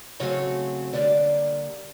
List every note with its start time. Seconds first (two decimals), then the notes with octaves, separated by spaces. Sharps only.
0.20 C#3 F#3 A3 C4 C#5
0.93 D3 G3 A#3 D4 D5